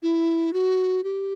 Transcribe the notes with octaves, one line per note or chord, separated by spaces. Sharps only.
E4
F#4
G4